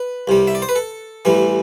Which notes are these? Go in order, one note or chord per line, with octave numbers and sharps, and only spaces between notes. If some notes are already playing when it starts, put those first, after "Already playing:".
Already playing: B4
C2 C3 G3
E5
D5
C5
B4
A4
A1 A2 E3 G3